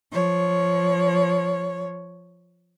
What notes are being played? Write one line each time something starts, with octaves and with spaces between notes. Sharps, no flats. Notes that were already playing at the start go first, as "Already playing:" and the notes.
F3 C#5